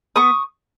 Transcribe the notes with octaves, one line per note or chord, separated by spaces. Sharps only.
B3 C#6 D#6